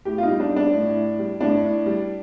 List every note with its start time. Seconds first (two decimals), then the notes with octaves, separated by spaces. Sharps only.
0.05 A2 G4
0.18 F4
0.23 D#4
0.29 G3
0.40 D4
0.51 G3
0.56 D4
0.73 A2
0.96 A2
1.19 G3
1.41 A2 D4
1.64 A2
1.86 G3